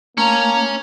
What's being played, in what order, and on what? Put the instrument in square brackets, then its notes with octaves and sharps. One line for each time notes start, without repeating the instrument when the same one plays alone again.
[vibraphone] A3 [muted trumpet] A#3 [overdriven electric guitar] C#4 [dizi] A#5